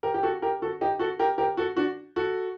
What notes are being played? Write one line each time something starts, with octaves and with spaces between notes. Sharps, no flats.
G4 A#4
G4
F#4 A4
G4 A#4
F#4 A4
D#4 G4
F#4 A4
G4 A#4
G4 A#4
F#4 A4
D4 F#4
F#4 A4